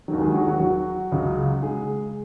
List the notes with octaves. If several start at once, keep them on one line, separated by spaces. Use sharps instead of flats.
D#2 D#3 F#3
G#3 G#4
F#3 F#4
F#3 F#4
F#3 F#4
C#2 C#3 F#3
G#3 G#4